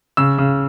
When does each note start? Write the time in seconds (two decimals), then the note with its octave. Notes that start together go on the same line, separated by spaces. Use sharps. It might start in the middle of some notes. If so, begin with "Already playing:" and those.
0.17 C#3 E6
0.38 C#3